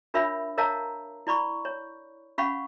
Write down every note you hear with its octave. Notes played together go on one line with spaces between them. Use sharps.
D4 F4 A#4 C#5 E5 B5
A#4 C#5 D#5 F5 A5 A#5
E4 D5 B5 C#6
C#5
C#4 F5 F#5 B5 C#6